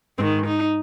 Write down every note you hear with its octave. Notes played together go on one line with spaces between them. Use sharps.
G#2 D#3 C4
D#4